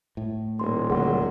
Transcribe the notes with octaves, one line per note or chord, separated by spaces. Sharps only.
A2
D#1 A#3 C6
D2 F#3 G#4 F#5 C6